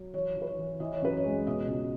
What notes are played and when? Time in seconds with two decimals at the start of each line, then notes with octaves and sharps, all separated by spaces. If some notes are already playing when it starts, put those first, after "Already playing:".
Already playing: F#3
0.13 E3 C#5
0.36 E3
0.42 B4
0.47 C#5
0.58 E3
0.80 E3 D#5
0.93 C#5
1.02 F#2 B4
1.17 C#5
1.24 G#3
1.47 B2 D#5
1.68 C#2